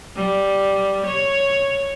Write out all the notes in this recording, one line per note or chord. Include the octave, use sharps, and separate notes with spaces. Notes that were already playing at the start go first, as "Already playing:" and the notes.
G3
C#5